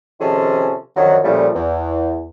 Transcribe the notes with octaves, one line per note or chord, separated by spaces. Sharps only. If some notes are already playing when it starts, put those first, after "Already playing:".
C3 D#3 F3 C#4 G#4 A4
F#2 D3 D#3 F3 F#3
A#2 C#3 F3 G3 A3
E2